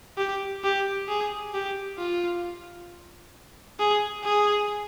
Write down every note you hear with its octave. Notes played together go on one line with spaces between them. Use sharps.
G4
G4
G#4
G4
F4
G#4
G#4